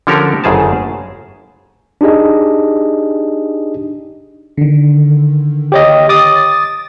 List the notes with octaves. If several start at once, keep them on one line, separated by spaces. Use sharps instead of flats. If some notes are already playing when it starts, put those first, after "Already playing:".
D3 F3 C#4 G4 A4 A#4
G1 F#2 C#3 G#4 C5 A5
D4 D#4 G4 G#4 D#5
D3 D#3
G4 C#5 D#5
D6 D#6 A6